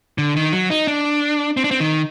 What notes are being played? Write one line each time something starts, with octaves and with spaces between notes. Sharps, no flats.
D3
D#3
F#3
D#4
D4
C4
D4
C4
D#3